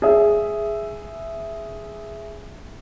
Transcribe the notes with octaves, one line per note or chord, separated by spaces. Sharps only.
G#4 E5